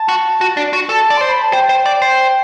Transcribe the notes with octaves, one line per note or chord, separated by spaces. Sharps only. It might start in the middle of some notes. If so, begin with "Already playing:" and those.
Already playing: A5
F#4
F#4
D4
F#4
A4 A5
D5
C5 C6
B5
A5
C5 G5
C5
D5
C5